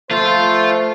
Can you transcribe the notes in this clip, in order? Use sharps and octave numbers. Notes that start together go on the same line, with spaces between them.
F3 A3 F4 C5